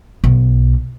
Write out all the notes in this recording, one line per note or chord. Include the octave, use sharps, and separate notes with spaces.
B1